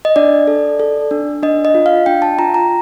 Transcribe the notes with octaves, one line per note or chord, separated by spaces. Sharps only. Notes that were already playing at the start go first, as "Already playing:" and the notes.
D#5
D4 D5
A4
A4
D4
D4 D#5
D#5
F4
F5
D4 G5
A5
F4 A#5
A#5